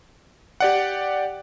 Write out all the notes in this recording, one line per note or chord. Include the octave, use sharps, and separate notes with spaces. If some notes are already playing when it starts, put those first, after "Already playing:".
G4 D5 F#5